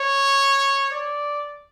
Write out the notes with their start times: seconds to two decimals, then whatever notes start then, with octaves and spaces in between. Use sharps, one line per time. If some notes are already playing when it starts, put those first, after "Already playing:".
Already playing: C#5
0.92 D5